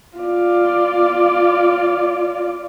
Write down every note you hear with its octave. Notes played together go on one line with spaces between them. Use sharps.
F4 D5